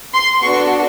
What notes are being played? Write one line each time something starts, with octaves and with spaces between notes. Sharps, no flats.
C6
B3 D4 F#4 A4 C#6